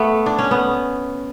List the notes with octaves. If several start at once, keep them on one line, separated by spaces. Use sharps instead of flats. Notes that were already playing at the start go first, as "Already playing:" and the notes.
Already playing: A3 B3
D4
C#4
B3